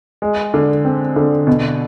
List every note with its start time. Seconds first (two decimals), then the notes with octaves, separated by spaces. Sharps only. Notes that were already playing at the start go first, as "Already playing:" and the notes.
0.22 G#3
0.54 D3
0.85 C4
1.16 D3
1.47 B2